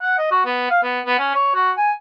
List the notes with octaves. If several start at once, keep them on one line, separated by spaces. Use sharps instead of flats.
F#5
D#5
F#4
B3
F5
B3
B3
C#4
C#5
F#4
G#5